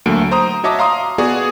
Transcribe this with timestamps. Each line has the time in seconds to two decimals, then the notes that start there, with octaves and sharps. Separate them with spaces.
0.06 D2 F#3 A3 A#3 D7
0.31 C5 A#5 D#6
0.64 F#4 C#5 D#5 E5 A5 D6
0.79 F5 A#5 C6 D#6
1.18 B3 F#4 G#4 D5